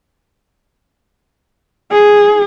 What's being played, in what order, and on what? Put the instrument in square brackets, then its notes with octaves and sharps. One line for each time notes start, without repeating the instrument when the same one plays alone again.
[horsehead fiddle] G#4